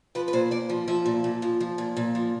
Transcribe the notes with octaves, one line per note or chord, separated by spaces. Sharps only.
F3 B4
B4
A#2 C5
A#2 D5
F3
F3 E5
A#2
A#2
F3
F3
A#2
A#2
F3